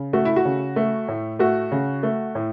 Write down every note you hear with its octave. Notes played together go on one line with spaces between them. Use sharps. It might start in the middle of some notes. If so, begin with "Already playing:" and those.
Already playing: C#3
A3 F#4
E4
F#4
C#3
A3
A2
A3 F#4
C#3
A3
A2